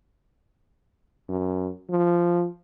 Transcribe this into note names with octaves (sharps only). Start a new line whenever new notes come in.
F#2
F3